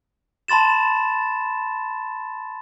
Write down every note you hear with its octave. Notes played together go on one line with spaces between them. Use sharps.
A5 B5 C6 A6 E7